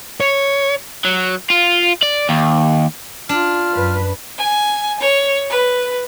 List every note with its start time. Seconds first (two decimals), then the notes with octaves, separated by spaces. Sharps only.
0.20 C#5
1.05 F#3
1.50 F4
2.02 D5
2.29 D#2
3.29 D4 F4 F6
3.74 F#2 B4
4.37 G#5
4.99 C#5
5.49 B4